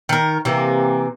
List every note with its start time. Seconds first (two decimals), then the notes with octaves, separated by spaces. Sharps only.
0.09 D#3 A#4
0.45 C3 E3 A#3